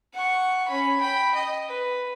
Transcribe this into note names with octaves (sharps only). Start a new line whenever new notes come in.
F#5 C#6
C#4 B5
G5 B5
D#5
B4